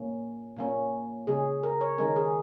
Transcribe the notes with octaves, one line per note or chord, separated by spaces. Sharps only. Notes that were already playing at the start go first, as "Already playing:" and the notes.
Already playing: A#2 A#3 C#4
A#2 A#3 C#4
C#3 G#3 C#4 G#4
A#4
C#5
D#3 G#3 C#4 A#4
G#4